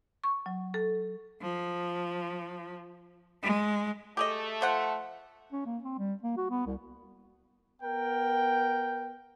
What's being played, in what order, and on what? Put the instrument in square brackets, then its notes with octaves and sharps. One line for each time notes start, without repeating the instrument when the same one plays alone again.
[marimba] C#6
F#3
A4
[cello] F3
G#3
[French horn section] A3 [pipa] G4 G#4 D#5
[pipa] F3 C5 F#5
[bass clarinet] C#4
A#3
C4
G3
A#3
F#4
B3
C2
[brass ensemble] B3 A#4 G5